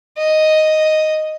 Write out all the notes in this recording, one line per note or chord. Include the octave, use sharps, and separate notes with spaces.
D#5